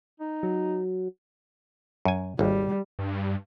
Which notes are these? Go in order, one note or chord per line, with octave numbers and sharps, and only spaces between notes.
D#4
F#3
F#2 G#5
G#1 D#2 G3
G2